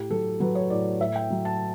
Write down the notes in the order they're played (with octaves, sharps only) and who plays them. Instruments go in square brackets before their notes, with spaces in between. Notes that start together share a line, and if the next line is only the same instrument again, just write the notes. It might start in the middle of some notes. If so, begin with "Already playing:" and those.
Already playing: [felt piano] A2 G4
F#3 A4
F#3 B4
C#5
A2 D5
A2 E5
G5
F#3
A5